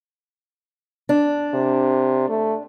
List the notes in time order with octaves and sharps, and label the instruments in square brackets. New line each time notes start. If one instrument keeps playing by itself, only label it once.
[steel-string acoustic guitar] D4
[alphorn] C3
A3